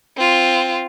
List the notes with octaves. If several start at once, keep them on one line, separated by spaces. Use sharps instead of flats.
C4 F4